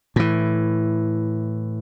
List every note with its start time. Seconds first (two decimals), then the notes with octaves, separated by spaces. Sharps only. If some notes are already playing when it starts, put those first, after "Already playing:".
0.16 A2 E3